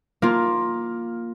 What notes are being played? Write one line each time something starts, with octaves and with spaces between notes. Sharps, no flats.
A#3 F4